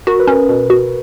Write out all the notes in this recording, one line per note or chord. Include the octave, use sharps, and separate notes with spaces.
F#4 A#4
B4
C#4 A#4
B2
F#4